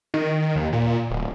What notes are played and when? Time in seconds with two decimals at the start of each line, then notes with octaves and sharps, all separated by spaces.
0.14 D#3
0.56 D#2
0.73 A#2
1.10 D1